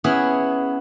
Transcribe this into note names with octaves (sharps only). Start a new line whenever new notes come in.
B3 C#4 E4 G#4